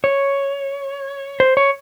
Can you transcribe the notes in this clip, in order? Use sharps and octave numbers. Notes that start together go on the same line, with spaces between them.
C#5
C5
C#5